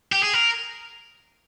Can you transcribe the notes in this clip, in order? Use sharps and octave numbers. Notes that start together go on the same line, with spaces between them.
G4
G#4
A#4